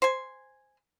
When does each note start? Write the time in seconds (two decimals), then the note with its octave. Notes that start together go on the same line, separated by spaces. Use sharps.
0.02 C5 G#5